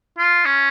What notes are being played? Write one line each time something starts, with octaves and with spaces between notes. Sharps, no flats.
F4
C#4